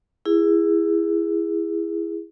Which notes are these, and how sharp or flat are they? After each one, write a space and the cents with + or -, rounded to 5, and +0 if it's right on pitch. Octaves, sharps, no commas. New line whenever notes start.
E4 +15 G#4 -15